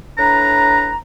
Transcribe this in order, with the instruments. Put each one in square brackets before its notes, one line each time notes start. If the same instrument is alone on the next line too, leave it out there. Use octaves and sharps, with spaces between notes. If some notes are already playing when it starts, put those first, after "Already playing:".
[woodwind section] A2 D4 B4 A#5